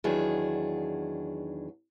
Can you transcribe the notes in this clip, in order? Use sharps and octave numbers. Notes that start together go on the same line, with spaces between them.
E2 D#3 F#3 D4 G#4